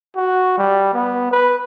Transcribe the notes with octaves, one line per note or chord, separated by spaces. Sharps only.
F#4
G3
B3
B4